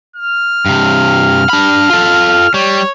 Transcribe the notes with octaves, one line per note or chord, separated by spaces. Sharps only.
F6
G2 C3
D4 B5
F4 A4
G3 C#5